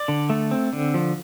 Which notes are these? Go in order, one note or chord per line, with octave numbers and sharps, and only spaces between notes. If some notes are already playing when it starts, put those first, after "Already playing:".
Already playing: D5
D3
A3
C4
D3
F3